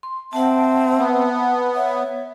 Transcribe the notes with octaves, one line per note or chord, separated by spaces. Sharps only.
C6
C4 E5 F#5 A5
B3
C#5 E5